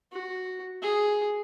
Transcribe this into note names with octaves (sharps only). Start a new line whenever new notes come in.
F#4
G#4